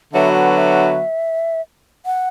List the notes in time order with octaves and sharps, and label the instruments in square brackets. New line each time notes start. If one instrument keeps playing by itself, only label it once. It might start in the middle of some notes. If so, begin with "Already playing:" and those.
[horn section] D3 F#3 B3 F#4 B4 [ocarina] E5
[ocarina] F#5
E5
F#5